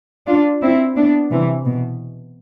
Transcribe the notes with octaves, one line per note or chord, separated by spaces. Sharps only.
D4 F4
C4 E4
B3 D4
C3 E3
B2